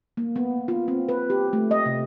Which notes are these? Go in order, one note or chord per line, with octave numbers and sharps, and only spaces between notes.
A#3
B3
F4
C4
B4
G4
A3
D#5
C3